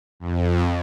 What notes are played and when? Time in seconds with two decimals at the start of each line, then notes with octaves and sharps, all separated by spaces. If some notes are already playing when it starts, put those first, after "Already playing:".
0.20 F2